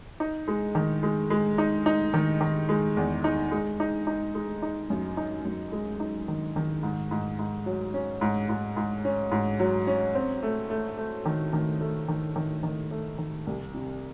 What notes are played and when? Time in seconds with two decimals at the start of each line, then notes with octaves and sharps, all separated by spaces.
0.20 D#4
0.48 G#3
0.75 D#3
1.03 G#3
1.30 G#3
1.58 D#4
1.86 D#4
2.14 D#3
2.41 D#3
2.69 G#3
2.97 E2
3.24 D#4
3.51 G#3
3.80 D#4
4.07 D#4
4.34 G#3
4.62 D#4
4.90 F#2
5.17 D#4
5.45 F#2
5.72 G#3
6.00 D#4
6.28 D#3
6.56 D#3
6.83 G#2
7.11 G#2
7.39 G#2
7.66 F#3
7.94 C#4
8.21 G#2
8.49 G#2
8.77 G#2
9.05 C#4
9.32 G#2
9.60 F#3
9.87 C#4
10.15 C4
10.43 A3
10.70 A3
10.98 A3
11.26 D#3
11.53 D#3
11.81 A3
12.08 D#3
12.36 D#3
12.63 D#3
12.91 A3
13.18 D#3
13.47 C2
13.74 C3